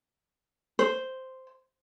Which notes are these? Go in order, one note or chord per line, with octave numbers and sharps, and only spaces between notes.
C5